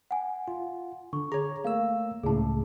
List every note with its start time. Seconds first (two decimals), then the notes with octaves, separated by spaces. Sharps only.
0.11 F#5 G#5
0.48 F4
1.13 D3 C#6
1.32 G#4 C#5 A#5
1.65 A3 A#3 F5 E6
2.24 C#2 A2 C#3 G#4 A5